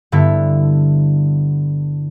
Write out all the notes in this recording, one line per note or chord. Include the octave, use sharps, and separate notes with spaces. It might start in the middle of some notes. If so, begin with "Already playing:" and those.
G2 D3 B3 E4